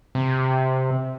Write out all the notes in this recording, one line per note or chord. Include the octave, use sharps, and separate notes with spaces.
C3